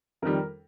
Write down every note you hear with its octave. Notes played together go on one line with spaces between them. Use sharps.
F2 D#3 G3 A#4